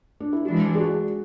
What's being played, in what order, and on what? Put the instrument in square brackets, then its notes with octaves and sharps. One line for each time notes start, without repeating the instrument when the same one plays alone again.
[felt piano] D4
E4
[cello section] E3 G#3 D4 [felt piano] F#4
[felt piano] G#4
F#4